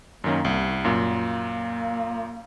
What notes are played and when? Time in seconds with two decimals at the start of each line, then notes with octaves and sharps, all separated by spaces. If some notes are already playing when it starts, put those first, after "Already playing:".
0.24 F#2 D#3 A#3 C#4
0.45 C2
0.85 F#2 A#2 A#3